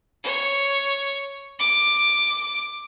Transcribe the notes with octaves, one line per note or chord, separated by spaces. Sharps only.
C#5
D6